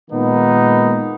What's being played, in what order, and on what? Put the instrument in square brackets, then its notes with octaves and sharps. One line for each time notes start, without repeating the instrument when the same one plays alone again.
[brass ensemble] A#2 D#3 G#3 A#3 B3 D#4